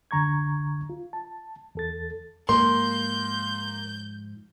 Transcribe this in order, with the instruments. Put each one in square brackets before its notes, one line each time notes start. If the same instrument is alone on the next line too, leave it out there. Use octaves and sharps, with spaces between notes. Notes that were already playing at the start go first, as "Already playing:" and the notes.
[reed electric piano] C2 F2 D3 A#5 C#6 G#6
F4
A5
E2 A4 A6
[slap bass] G#2 F3 [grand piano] A#3 [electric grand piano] C6 [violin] G6